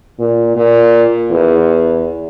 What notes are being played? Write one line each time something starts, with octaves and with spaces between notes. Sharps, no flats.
A#2
A#2
E2